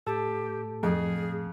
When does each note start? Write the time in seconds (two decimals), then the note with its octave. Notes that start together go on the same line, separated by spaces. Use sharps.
0.07 A2 G4 A4 A5
0.83 F2 G#4